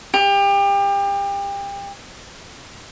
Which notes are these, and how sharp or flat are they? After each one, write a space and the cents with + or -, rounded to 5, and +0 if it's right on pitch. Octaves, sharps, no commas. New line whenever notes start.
G4 +30